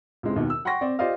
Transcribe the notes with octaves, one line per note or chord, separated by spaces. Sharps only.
C#2 A2 G#3 C4
D#2 B2 D#3
E6
F#5 G5 C6 C#6 A#6
C4 D5
F4 G4 C5 D5 D#5 F5